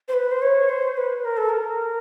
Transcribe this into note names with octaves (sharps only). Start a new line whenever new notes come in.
C5
B4
C5
C#5
C5
B4
A#4
A4
A#4